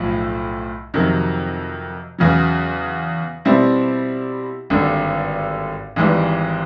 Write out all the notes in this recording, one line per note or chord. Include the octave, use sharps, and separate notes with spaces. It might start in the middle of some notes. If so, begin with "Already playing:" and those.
Already playing: B1 A2 F3
F2 C3 D#3 F#3
E2 C#3 F#3
B2 G3 C4 E4
G#1 G2 D3
G#1 G#2 E3 G3